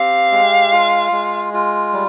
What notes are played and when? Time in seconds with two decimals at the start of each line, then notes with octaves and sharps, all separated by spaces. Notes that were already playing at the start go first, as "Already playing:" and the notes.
Already playing: C4 G4 F5
0.32 G#3
0.72 F4
1.12 G#3
1.53 F4
1.93 G3